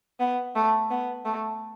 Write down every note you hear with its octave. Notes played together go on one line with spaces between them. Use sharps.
B3
A3
B3
A3